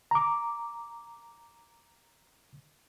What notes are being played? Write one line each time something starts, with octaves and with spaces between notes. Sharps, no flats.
A#5 D6